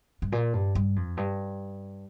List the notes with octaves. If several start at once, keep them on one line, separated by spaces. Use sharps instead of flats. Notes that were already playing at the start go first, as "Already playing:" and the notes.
G2
A#2
G2
G2
F2
G2